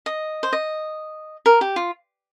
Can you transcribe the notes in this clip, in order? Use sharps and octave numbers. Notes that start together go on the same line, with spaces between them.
D#5
C5
D#5
A#4
G4
F4